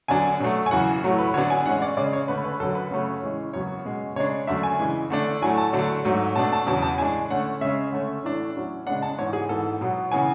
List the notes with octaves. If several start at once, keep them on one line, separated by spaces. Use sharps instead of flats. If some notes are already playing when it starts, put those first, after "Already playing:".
F#2 D3 F#3 B3 D4 G#5
B2 F#3 A3
G#5
F#2 C#3 E3 F#5
A2 F#3 A3
B4
D3 F#3 B3 D4 C#5
G#5
A2 E3 G#3 C#4 F#5
D5
C#3 G#3 C#4 D5
C#5
D3 A3 C#4 B4
B4
F#2 D3 F#3 A4
B4
C#3 F#3 A3 C#4
A2 E3 G#3 C#4
F#2 C#3 F#3 B3 C#5
B2 G#3 C#4
C#3 G#3 D4 C#5
F#2 D3 A3 D4 E5
G#5
C#3 E3 G#3
D3 A3 D4
A2 F#3 A3 G#5
A5
D3 F#3 A3 D4
G#2 F#3 A3
B2 A3 D4 A5
A5
E2 C#3 F#3 A5
A5
A2 G#3 D4 G#5
D3 A3 C#4 F#5
C#3 G#3 C#4 E5
D3 A3 C#4
A2 E3 A3 D4
A2 F#3 C#4
C#3 G#3 B3 D4 F#5
A5
G#2 E3 B3 C#5
G#4
G#2 E3 B3 A4
B2 F#3 B3
C#3 E3 B3 G#5